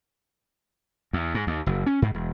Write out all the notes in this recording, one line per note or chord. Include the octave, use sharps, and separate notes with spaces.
E2
G#2
D#2
F#1
C#4
G#2
E1